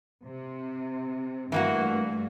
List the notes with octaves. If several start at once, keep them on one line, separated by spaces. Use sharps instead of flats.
C3
G2 E3 A3 A#3 F#4